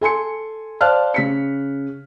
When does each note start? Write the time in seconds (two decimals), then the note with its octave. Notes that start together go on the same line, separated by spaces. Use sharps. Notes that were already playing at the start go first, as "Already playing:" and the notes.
0.01 A4 G#5 C6 C#7
0.81 C5 D5 F5 A5 F6 F#6
1.14 C#3 B6 C#7